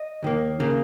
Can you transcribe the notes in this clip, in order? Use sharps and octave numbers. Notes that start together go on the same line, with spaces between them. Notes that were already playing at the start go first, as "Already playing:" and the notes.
Already playing: D#5
D#2 D#3 A#3
C#3 A#3